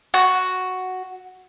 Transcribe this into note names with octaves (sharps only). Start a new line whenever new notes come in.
F#4